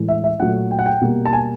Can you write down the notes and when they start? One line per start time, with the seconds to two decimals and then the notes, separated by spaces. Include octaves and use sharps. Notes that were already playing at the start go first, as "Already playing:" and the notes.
Already playing: A2 E3 G#3
0.08 E5
0.24 E5
0.40 A#2 F#3 A3 F#5
0.71 G5
0.79 F#5
0.86 G5
1.01 B2 G3 A#3
1.25 A5
1.33 G#5